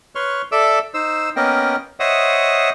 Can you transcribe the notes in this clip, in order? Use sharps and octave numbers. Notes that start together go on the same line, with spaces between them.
B4 C#5 C6 C#6 F6
A4 D5 E5 D6 E6
D#4 C5 E6
A#3 B3 C#4 A#4 D#5 G5
C5 C#5 D#5 E5 F#5 D#6